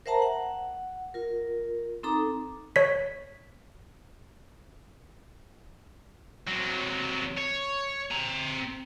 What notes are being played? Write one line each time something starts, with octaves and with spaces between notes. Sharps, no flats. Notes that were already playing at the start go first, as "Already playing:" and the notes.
A#4 C5 E5 F#5 A5 A#5
F#5
F4 A#4
C4 D#4 A4 A#5 D6
C#5 B6
C3 F#3
C#5
C4 A#5